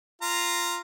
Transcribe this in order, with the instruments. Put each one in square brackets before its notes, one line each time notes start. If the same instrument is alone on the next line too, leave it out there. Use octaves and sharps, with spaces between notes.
[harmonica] F4 A#5